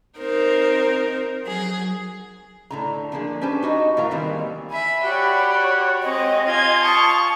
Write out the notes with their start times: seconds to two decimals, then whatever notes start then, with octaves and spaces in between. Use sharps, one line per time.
0.19 C4 D#4 A#4 C5
1.46 F#3 G#4
2.71 A2 D3 A#5
3.12 F3 A#3 D4 F#4 G#4
3.41 C#4 G4 B4 C5 A5
3.63 D#4 F#4 D#5
3.97 A2 E3 A#4 F5 A#5
4.11 D#3 E3 G3 G#3 A#3 C4
4.70 E5 G#5 B5
5.04 F#4 G4 C#5 D5
6.02 G#3 C4 C#5 D#5
6.48 F4 G#5 G#6
6.83 A5 C#6 D#6